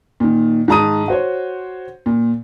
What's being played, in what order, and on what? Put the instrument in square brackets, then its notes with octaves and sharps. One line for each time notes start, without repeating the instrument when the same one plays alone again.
[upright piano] A#2 D#3
G#2 D#3 A5 A#5 D#6 D#7
F#4 C5 C#5
A#2